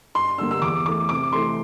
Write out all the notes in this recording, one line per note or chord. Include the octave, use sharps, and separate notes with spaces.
G2 C6
D3 G3 A#3 E6
E6
E2 D6
E3 A3 D6
C3 D6
E3 A3 C6